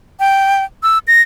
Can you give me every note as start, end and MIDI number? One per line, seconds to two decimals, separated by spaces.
0.20 0.64 79
0.83 0.98 88
1.08 1.22 94